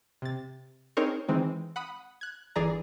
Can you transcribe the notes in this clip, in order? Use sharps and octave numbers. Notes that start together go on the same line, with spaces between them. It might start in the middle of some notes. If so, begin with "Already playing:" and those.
C3 A6
C4 D#4 G#4 A#4 C5 C#5
D#3 E3 G#3 C4 D#4
F#5 B5 D#6
F#6 G#6
G1 E3 G#4 D5 A#5